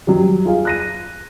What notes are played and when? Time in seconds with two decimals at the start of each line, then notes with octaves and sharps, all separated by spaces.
0.07 F#3 G3
0.45 F4 G#4 F5
0.65 F#6 A#6 D#7